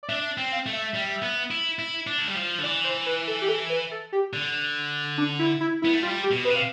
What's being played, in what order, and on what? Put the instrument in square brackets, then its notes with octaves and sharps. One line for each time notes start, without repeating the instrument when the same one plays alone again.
[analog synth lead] D5
[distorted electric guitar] D4 [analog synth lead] E5
[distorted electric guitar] C4
[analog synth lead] F5
[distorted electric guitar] A3
[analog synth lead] E5
[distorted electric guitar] G3
B3
E4
E4
D4
A3
G3
F3
D3
[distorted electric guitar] E3 [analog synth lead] D5
[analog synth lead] C5
B4
A4
G4
A4
B4
A4
G4
[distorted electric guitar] D3
[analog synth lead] D4
E4
E4
E4
[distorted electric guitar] B3
A3
[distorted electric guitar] G3 [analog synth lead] F4
[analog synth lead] G4
[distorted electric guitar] B2
[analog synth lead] B4
[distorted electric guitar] C3
[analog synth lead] F5